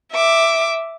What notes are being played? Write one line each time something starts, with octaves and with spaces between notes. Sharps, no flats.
E5 D6